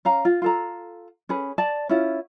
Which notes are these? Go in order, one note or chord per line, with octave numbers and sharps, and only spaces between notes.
C#4 F5 A#5
F4
F4 A4 A#5
C#4 G#4 B4
D5 A5
C#4 E4 F4